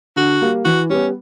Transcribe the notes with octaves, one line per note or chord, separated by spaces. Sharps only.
D3 F#4
G3 A#3
E3 F#4
G3 B3 C#4